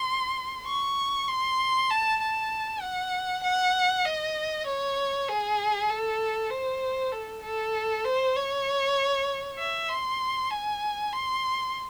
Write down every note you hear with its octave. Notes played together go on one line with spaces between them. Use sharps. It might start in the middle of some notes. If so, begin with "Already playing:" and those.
Already playing: C6
C#6
C6
A5
A5
F#5
F#5
D#5
C#5
G#4
A4
C5
A4
A4
C5
C#5
E5
C6
G#5
C6